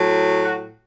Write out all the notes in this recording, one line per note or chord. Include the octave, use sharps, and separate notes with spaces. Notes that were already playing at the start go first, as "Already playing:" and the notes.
Already playing: A2 F#3
F#4